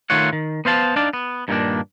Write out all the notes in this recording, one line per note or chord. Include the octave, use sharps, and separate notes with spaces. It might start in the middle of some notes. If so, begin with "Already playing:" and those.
D#3 A3 F4 C#5 F#5
D#3
B3 C5 F5 A5
D4 D#4 D5 F5 A5
B3
G2 A#2 D#3 G#3 A#3 D4